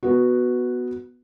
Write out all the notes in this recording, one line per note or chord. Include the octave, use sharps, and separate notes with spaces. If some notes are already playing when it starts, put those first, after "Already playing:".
B3 F#4